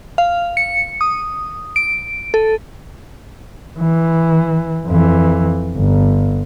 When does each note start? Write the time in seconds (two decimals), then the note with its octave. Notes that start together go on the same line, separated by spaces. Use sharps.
0.18 F5
0.57 C#7
1.01 D#6
1.76 D7
2.34 A4
3.79 E3
4.87 F2 E3
5.76 G1